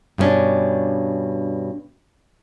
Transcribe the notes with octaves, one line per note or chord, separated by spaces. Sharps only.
G2 B2 A3 C#4 D4